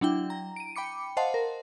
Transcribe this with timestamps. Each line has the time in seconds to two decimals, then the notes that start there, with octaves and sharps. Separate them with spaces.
0.01 F#3 D4 E4 G5
0.30 A#5
0.56 D7 D#7
0.76 G5 B5 D6 C#7
1.17 C5 D#5 F5 F#5 A5 C6
1.34 A#4